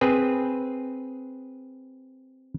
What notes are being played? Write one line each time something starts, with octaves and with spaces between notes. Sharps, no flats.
C4 G#4 B4